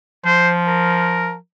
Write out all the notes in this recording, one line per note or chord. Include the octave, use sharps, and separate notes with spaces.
F3 C5
A#4